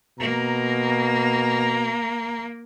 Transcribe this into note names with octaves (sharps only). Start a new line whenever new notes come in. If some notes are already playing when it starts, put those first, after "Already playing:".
B2 A#3 A#5